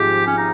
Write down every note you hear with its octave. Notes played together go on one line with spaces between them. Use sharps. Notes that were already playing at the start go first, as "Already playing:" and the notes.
Already playing: G#1 G#2 F3 G#3 G4
C#4
D#4